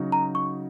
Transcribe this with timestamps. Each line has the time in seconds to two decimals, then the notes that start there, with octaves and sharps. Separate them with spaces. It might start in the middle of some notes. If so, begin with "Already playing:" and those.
Already playing: C#3 F#3 D#4 F#4
0.12 A#5
0.35 C#6